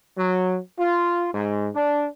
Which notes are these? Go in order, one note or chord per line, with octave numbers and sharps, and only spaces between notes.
F#3
F4
G#2
D4